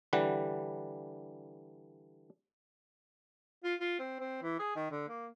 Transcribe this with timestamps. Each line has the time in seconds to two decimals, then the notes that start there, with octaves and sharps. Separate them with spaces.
0.13 D3 E3 G3 F#5
3.64 F4
3.80 F4
3.99 C4
4.20 C4
4.43 E3
4.59 G#4
4.76 D#3
4.91 D3
5.08 A#3